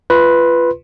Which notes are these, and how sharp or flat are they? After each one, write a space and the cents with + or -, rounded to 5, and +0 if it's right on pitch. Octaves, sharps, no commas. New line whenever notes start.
F4 -20 B4 +0 C6 +15